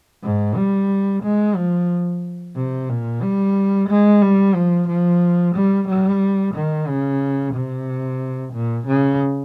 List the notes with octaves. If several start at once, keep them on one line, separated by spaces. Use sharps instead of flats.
G#2
G3
G#3
F3
C3
A#2
G3
G#3
G3
F3
F3
G3
G3
D#3
C#3
C3
A#2
C#3